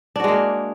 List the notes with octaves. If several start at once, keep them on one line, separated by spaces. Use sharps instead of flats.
G#3 A#3 D4 F#4